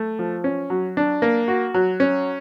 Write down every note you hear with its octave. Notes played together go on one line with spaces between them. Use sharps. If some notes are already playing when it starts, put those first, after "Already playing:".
Already playing: A3
F3
C#4
F#3
D4
A#3
F#4
F#3
C#4